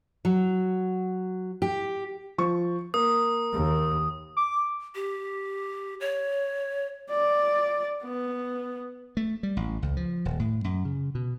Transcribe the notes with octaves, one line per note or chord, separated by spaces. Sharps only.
F#3
G4
F3 C#6
A#3 D#6
D#2
D6
G4
C#5
D5
B3
A3
G3
A1
C#2
F3
D#1
A2
F#2
C#3
B2